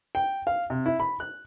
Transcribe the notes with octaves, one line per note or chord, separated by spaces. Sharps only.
G5
F5
C3
E4
B5
F#6